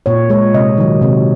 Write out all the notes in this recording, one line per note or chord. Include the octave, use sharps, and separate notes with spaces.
A#2 C#5
G#3 C#5
C3 D#5
D#3 F#3
C3